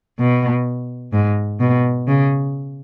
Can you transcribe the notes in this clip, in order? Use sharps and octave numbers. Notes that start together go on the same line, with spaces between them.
B2
G#2
B2
C#3